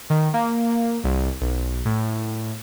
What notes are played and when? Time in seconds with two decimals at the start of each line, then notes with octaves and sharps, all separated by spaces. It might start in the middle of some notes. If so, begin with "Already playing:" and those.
0.10 D#3
0.34 A#3
1.04 C2
1.41 B1
1.85 A2